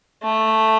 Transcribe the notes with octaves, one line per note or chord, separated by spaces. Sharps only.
A3